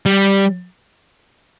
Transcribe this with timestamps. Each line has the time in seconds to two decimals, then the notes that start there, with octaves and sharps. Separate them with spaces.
0.06 G3